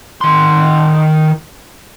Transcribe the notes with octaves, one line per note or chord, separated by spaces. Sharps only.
D#3 C6